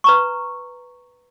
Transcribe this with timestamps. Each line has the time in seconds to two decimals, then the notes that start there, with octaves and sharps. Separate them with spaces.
0.04 B4 A#5 C#6